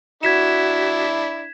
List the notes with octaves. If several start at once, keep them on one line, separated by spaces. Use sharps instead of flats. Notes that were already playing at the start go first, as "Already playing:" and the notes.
D4 E4 F#4 G#6 B6 E7